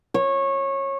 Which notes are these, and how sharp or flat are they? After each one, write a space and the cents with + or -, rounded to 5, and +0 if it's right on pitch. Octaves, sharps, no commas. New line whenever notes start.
C#5 -20